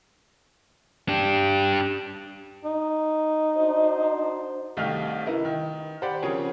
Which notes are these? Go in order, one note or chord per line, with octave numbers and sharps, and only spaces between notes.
D4 G4
D#4
D4 F#4 C5
C2 D#3 A3 G4 F5 F6
D#4 E4 A#4 B4
D#3
G4 C5 D5 F#5 B5
C#3 F3 C4 G#4 A#4 C#5